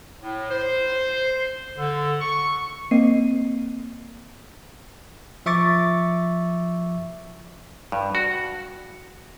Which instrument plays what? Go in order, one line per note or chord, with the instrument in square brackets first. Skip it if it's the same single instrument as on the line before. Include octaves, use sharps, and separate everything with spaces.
[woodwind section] A2
C5
D3
C#6
[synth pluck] A#3 C4 D#5 C7 D#7
[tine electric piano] F3 E5 C#6 D6 A6
[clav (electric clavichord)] G2
F#4